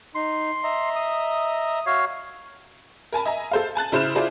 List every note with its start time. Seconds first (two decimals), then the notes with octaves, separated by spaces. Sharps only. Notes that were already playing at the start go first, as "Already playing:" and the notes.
0.15 D#4 C6
0.64 D#5 E5 A#5
0.96 D#6
1.86 F#4 C#5 E5 F5
3.12 A#4 G#5 A5 B5
3.26 D#5 E5 G#5 A#5
3.51 A4 C5 F5
3.75 G#5 A5 F#6 A6
3.92 C#3 E4 C5 B5 F6 E7
4.15 E4 F4 G#4 C5 D5